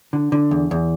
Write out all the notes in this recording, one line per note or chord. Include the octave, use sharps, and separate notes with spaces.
D3
D3
E2
E2